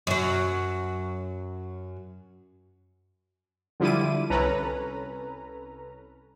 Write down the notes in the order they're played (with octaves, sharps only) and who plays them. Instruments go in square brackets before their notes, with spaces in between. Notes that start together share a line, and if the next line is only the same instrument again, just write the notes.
[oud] F#2 F#3
[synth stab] D3 F3 G3 E4 D6 D#7
C2 C#4 A4 B4 A#5